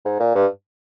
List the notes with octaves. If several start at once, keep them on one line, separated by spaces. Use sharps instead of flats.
G#2
A#2
G2